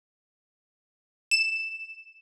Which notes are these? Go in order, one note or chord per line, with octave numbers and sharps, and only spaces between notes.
E7